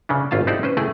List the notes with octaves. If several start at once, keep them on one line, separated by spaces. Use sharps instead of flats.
C#3 C#4 D4
G#1 C#4 F4 F5 A5
D#4 E4 G4 A4 C5 D5
C#4 B4 C5
A3 E4 G#4 G5